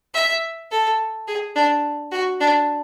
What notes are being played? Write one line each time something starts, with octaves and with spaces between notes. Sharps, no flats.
E5
A4
G#4
D4
F#4
D4